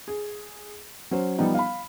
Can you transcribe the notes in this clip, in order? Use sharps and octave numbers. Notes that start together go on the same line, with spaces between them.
G#4
F#3 C#4 C5
F3 G3 B3 D#4
F5 B5